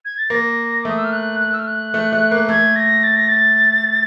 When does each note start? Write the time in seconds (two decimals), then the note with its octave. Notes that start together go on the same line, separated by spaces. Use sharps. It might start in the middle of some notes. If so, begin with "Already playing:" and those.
0.05 G#6
0.17 A6
0.30 A#3 A#6
0.82 D6
0.85 A3 D#6
0.97 E6
1.04 F6
1.13 F#6
1.40 F#6
1.53 E6
1.59 F6
1.67 F#6
1.94 A3
2.13 A3
2.31 A#3
2.49 A3 G#6
2.76 A#6
3.03 A6
3.16 A#6
3.28 A6